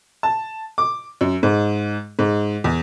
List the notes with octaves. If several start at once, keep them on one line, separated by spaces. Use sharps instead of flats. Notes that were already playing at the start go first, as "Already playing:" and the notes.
A5
D6
F#2
G#2
G#2
E2